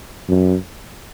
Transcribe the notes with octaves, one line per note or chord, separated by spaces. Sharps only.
F#2